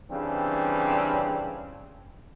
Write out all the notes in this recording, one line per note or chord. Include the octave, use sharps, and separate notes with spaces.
C#3 E3 G3 C4 D4